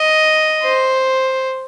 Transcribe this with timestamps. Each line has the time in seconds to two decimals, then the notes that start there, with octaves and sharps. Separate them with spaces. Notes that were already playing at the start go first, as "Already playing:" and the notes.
Already playing: D#5
0.63 C5